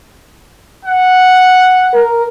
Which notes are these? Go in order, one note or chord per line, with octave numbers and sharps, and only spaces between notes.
F#5
A#4